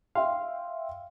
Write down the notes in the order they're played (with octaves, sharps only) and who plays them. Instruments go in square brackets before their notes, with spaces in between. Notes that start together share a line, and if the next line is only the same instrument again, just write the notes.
[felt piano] E5 G5 C6 [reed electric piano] F5